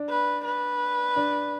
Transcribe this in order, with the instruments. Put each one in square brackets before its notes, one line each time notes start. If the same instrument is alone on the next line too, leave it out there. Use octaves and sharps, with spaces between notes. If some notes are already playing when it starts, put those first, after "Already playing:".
Already playing: [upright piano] D4
[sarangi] B4
B4
[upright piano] D4